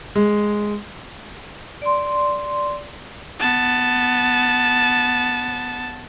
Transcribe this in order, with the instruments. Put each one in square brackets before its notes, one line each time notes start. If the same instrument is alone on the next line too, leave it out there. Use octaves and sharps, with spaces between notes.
[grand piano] G#3
[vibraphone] D5 C6
[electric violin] B3 A5